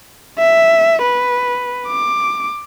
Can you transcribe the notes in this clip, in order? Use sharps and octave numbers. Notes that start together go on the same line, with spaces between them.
E5
B4
D6